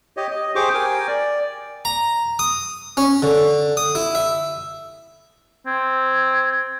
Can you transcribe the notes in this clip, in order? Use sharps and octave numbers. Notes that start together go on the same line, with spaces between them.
G4 C#5 D#5
D#5
G4 G#4 C5 C#6 D6
A#4 G5 G#5
D5
A#5
D#6
C#4
D3
D#6
E4
E5
C4 G#6